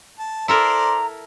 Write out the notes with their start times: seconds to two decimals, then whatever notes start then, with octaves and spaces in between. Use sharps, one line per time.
0.19 A5
0.48 E4 A4 A#4 C5 D5 A#5 C6